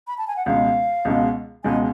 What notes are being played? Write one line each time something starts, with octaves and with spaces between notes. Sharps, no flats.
B5
A5
G#5
F#5
C#2 B2 G#3 F5
C#2 B2 G#3
C#2 B2 G#3 G#5